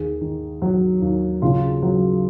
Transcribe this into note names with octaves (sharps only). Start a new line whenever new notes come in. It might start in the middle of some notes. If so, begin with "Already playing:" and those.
Already playing: D#2 G#4
D#3
F#3
D#2
C#3 F4
F#3